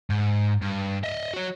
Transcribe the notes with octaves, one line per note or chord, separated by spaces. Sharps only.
G#2
G2
D#5 E5
F#4 C#5